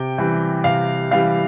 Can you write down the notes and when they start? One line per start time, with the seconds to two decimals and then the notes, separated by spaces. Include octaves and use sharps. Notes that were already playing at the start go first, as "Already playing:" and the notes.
Already playing: C3 G5
0.18 E3 G3
0.64 C3 F5
1.11 E3 G3 F5